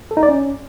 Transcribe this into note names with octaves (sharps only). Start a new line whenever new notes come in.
A4
D#4
D5
C#4